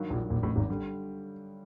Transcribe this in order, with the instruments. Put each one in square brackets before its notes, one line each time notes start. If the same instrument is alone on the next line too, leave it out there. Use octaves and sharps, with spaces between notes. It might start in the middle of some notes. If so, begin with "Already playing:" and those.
Already playing: [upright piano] G2 D#3 F#3 A#3
[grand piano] A#1 A#2
A#1 A#2
A1 A2
G#1 G#2
[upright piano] D3 G3